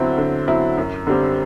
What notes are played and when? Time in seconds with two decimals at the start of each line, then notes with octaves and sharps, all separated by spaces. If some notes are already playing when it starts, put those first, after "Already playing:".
Already playing: D3 F#3 C4 E4
0.18 D3
0.47 F#3 C4 E4
0.77 F#2
1.07 D3 G3 C4